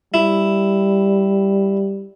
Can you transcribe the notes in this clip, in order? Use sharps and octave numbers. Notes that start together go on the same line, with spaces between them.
G3 E4